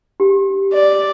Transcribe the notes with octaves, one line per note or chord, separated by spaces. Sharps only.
G4
D5